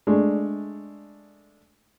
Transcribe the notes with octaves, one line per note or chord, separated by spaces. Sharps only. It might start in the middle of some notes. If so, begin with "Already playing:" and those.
G#3 A3 D4